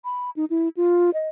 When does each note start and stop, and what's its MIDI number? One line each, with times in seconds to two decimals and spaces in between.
0.05 0.30 83
0.36 0.45 63
0.50 0.69 64
0.77 1.10 65
1.14 1.29 75